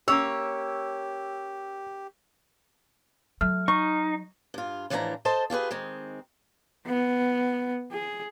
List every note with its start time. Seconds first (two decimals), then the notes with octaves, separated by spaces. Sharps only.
0.08 A#3 C#4 G4 C#5 E6
3.41 F#3 A3 F6
3.68 D#4 C#6
4.54 G2 F4
4.90 A2 E3 F3 D4 G5 A#5
5.25 A4 C5 D#5 A5
5.50 F4 G4 G#4 B4
5.71 D#3 G#3 C4
6.87 B3
7.92 G#4